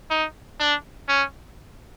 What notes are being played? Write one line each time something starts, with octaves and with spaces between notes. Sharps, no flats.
D#4
D4
C#4